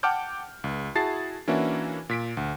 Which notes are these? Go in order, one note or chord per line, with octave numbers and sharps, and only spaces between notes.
F#5 G5 A5 D6 F6 G6
C#2
E4 F#4 G#4 A5 A6 C7
E3 A#3 C#4 D4 E4 F#4
A#2 B6 D7
D2